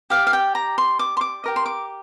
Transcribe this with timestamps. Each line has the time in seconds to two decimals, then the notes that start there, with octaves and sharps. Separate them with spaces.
0.10 G4 D5 F5
0.27 F5
0.33 G5
0.55 A#5
0.78 C6
0.99 D6
1.17 C6
1.21 D6
1.44 G4 A#4 D#5
1.56 C6
1.66 D6